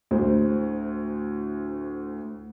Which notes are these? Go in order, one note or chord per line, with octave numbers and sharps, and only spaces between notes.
D2 A2 C5